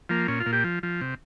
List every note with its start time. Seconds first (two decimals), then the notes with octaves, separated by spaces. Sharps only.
0.09 F3 A#3
0.28 A#2 C#4
0.40 F4
0.46 A#2
0.53 G4
0.64 F3
0.83 F3
1.01 C3